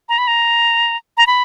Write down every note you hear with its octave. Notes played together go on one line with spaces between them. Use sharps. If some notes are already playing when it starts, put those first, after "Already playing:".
A#5
B5
A#5
A#5
B5